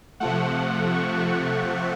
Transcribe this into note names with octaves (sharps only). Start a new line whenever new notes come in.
C3 F3 A3 F#5
F#5
C#6